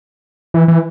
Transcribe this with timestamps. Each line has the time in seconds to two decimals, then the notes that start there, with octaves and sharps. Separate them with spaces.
0.54 E3
0.68 E3